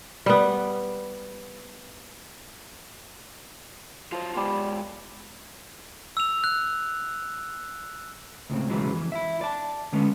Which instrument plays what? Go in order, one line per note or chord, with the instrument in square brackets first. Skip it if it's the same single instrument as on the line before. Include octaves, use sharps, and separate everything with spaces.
[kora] G3 B3
[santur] F3 D#5 [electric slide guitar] F#3 F4 F5
[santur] G3 D5 D6 [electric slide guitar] G#3 B3 F4
[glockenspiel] E6 F7
F#6
[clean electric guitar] C#2 A2 C4
B1 E2 C#3 E3 F#3 G#3
F2 E3
E4 E5
D5 A5
D3 G#3 B3 C#4